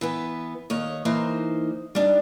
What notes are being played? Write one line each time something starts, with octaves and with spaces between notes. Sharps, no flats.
E3 B3 B4
D#2 C#5 D#5
E3 A#3 D#4 C5
G3 D4 D#4